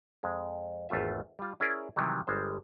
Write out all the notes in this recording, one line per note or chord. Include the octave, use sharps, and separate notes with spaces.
F2 G#3
G#1 E2 A3 F4 E5
G3 F4
C#4 E4 G#4 A#4 D5
C3 D#3 E3 F#3 G3
G1 G3 G#3 C5